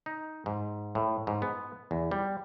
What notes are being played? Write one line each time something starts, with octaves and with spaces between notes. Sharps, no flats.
D#4
G#2
A2
G#2
B3
E2
G3